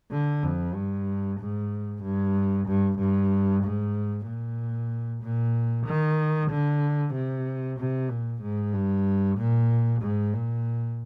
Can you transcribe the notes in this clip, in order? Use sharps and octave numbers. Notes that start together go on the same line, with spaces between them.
D3
F2
G2
G#2
G2
G2
G2
G#2
A#2
A#2
D#3
D3
C3
C3
A#2
G#2
G2
A#2
G#2
A#2